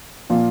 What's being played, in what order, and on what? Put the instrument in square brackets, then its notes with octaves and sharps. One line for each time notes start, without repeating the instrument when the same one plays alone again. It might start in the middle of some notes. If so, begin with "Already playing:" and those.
[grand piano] A#2 F3 A#3 F4